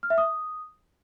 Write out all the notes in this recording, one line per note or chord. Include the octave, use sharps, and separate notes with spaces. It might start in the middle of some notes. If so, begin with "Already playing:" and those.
F6
E5
D#6